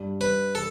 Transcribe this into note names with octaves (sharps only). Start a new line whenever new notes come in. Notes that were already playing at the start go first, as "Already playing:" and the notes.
Already playing: G2
G2 B4
A4